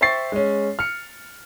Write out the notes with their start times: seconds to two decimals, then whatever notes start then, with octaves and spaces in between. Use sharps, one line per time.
0.01 C5 E5 G5 C#6 A6 C7
0.32 G#3 C#4
0.79 F6 C#7